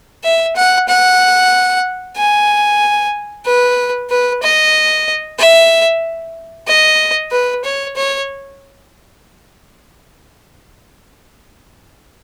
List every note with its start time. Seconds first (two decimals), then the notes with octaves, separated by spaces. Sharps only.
0.24 E5
0.56 F#5
0.88 F#5
2.17 G#5
3.46 B4
4.10 B4
4.43 D#5
5.39 E5
6.68 D#5
7.31 B4
7.64 C#5
7.96 C#5